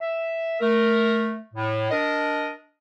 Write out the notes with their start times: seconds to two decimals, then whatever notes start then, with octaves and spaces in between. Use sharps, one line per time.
0.01 E5
0.60 A3 A#4
1.54 A2
1.91 D4 A#4 D#5